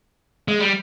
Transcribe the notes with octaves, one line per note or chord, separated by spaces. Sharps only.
G#3
G3